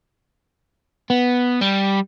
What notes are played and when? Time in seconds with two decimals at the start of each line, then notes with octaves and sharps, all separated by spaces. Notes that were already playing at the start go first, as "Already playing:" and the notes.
1.10 B3
1.61 G3